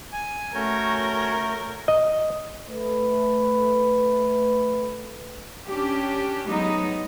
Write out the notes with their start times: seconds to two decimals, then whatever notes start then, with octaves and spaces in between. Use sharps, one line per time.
0.13 G#5
0.55 A3 C#4 F#4 A#4 C#5 G6
1.88 D#5
2.70 A3 B4
5.67 C#4 D4 G4
6.47 F#3 G#3 B3 D#4